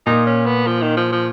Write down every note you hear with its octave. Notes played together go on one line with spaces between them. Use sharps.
A#2 D#4
C#4
B3
F3
D#3
F3
F3